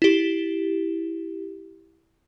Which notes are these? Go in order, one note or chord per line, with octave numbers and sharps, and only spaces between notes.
E4 G4